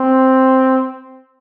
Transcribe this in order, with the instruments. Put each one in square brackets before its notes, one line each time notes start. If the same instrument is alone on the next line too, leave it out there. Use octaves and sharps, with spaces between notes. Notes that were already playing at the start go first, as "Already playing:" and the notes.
Already playing: [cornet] C4